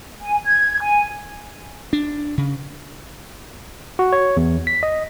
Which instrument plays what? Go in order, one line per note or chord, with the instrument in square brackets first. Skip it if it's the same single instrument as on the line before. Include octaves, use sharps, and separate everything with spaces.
[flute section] G#5
G#6
G#5
[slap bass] D4
C#3
[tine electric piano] F#4
C#5
E2
B6
D#5